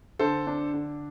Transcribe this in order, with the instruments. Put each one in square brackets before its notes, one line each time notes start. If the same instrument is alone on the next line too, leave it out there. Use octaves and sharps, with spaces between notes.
[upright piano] D3 [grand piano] A4 C5
[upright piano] D4
D3